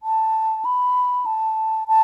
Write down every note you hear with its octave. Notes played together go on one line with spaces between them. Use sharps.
A5
B5
A5
A5